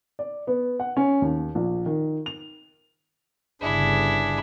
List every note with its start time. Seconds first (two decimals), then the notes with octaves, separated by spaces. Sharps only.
0.19 D5
0.47 B3
0.80 F#5
0.97 C#4
1.22 D#2
1.55 A#1
1.86 D#3
2.26 F7
3.61 G1 C#3 D4 E4 G#4